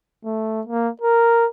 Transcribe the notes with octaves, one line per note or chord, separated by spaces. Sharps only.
A3
A#3
A#4